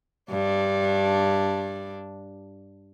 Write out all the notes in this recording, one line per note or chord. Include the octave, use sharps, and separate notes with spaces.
G2 D4